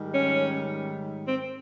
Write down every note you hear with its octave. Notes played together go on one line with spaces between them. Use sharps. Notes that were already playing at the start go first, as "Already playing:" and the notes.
Already playing: G#2 D#3 G3
C#4
C4